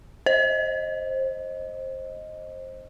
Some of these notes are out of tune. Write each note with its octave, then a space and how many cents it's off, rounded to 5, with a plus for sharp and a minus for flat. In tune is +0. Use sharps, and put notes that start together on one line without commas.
C5 +20 D#5 +0